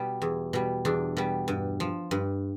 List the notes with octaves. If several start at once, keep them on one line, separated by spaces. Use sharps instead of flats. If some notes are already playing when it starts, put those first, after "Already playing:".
Already playing: B2 G3
E2
B2 G3
E2 D4
B2 G3
G2
F3
G2